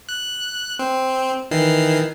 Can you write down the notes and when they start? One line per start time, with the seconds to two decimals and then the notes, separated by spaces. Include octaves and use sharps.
0.09 F#6
0.79 C4
1.51 D#3 E3 C7